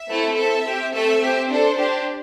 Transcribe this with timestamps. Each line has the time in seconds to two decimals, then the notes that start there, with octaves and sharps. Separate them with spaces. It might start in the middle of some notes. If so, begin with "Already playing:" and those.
Already playing: E5
0.08 A3 C4 E4 A4
0.36 C4 A4 E5
0.64 C4 G4
0.93 A3 C4 A4 E5
1.22 C4 G4
1.50 D4 A4 C5
1.78 D4 G4